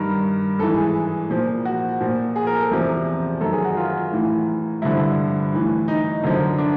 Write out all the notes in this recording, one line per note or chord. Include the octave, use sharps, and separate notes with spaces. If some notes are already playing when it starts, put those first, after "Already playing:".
Already playing: G2 D#3 A#4
G#2 E3 A4
G#4
A#2 F3
F#4
A#2 F3
G#4
A#4
A4
E2 C3 F3
F#2 D#3 A4
G#4
F#4
F4
A2 E3
G2 D3 F3 E4
A2 E3
D#4
F#2 D3 F3
D4